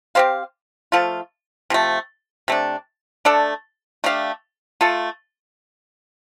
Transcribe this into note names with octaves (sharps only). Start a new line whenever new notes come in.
C4 G4 C5 F5
F3 A3 F4
C3 F3 A3
C3 A3 D4
A3 D4 A4 D5
A3 D4 G4 F5
A3 F4 A4